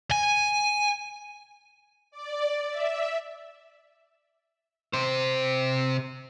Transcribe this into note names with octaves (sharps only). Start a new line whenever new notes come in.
G#5
D5
E5
C3 C5